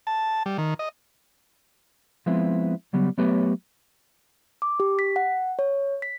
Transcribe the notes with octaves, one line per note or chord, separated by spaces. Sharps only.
A5
G3
D#3
D#5
F3 G#3 B3 C4 E4
C#3 F#3 G3 B3
F#3 A3 B3 G4 B4 C#5
D6
G4
B6
F#5
C#5
B6